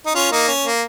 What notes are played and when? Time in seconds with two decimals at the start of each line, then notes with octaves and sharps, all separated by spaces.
0.06 D#4
0.15 C#4 F4
0.32 A#3 D#4
0.48 C#4
0.65 A#3